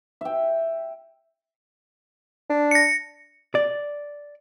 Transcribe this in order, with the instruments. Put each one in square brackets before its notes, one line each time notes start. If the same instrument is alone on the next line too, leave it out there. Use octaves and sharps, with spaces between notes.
[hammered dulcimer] E5 G5
[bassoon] D4
[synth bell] A#6 C#7
[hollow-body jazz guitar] D5